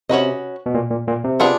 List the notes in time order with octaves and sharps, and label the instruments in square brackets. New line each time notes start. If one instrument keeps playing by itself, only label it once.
[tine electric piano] C3 [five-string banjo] C#4 F#4 B4 D#5
[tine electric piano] B2
A#2
A#2
A#2
C3
[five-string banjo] B3 D4 F4 G#4